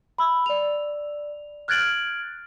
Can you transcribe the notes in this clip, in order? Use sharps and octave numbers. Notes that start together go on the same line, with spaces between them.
B5 E6
D5 F7
F6 F#6 G#6 A6 D7 F#7